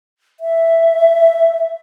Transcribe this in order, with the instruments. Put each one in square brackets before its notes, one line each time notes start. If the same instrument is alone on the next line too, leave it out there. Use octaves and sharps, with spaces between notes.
[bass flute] E5